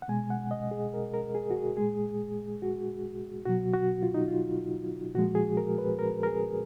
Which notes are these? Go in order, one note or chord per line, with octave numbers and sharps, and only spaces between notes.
F#5
B2 G#3 G#5
F#5
D#5
G#4
A#4
A#4
G#4
F#4
G#4
A#2 G#3 G#4
F#4
B2 F#3 F#4
F#4
F4
D#4
F4
A#2 F3 G#3 F#4
G#4
A#4
B4
A#4
A#4
G#4